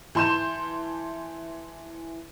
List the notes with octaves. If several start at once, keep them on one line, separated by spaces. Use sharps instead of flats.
E3 A5 C6 G6 E7